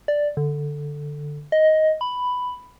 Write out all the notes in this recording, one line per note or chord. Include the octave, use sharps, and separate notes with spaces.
D5
D3
D#5
B5